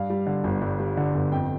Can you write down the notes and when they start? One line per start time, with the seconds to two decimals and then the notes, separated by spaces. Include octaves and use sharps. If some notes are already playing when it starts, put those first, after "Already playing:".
Already playing: G2 F5
0.10 G3
0.27 D3
0.44 G1
0.62 G2
0.79 G3
0.97 D3
1.14 G1
1.32 F2 G5